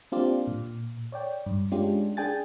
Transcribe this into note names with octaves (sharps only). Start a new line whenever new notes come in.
A#3 C4 D4 F4 G4 D5
A#2
C#5 D5 G5
G2
G#3 C#4 D4 F4 G4
D4 G#4 G5 G#5 A6